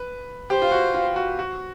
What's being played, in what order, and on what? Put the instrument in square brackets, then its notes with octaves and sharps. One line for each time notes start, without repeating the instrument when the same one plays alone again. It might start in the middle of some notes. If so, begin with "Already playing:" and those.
Already playing: [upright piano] B4
[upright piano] G4 [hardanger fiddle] C5
[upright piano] F4
F#4
F4
F#4
F#4